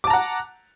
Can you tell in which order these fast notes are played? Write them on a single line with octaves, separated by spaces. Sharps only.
D6 A5 A#5 F#5